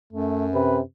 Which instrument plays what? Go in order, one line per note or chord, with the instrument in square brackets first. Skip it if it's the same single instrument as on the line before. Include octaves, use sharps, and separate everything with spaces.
[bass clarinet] F#2 [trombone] A3
[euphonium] C3 [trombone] B4